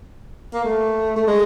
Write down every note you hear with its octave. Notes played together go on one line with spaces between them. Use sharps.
A#3
A3
A3
G#3